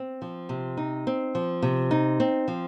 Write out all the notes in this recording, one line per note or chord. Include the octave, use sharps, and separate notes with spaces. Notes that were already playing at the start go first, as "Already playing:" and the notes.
Already playing: C4
F3
C3
D#4
C4
F3
C3
D#4
C4
F3